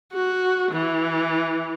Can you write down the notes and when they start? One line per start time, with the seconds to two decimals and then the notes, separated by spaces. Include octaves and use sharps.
0.13 F#4
0.71 E3